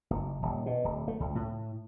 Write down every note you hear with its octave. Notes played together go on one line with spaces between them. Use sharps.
F#1
D#1
B2
D1
A3
C#2
A2